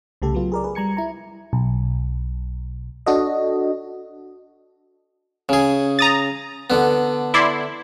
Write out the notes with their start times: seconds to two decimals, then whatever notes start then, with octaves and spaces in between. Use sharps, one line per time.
0.22 C2 C#3 A3 G4 A4
0.34 F#3 B3 F4
0.52 G#4 A#4 D5
0.64 G#4 B4
0.75 G3 A#5 G#6 C#7
0.97 E4 A#5
1.53 B1
3.06 D4 F#4 A4 D#5
5.49 C#3 G#4
5.99 A#5 D#6 A6
6.70 D3 B3
7.34 E4 D5 C6